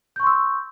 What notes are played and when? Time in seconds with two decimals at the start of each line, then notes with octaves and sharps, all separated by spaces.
0.16 G6
0.20 C#6
0.23 C6
0.27 E6